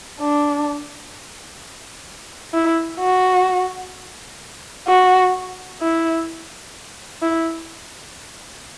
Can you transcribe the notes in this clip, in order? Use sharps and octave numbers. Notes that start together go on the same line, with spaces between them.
D4
E4
F#4
F#4
E4
E4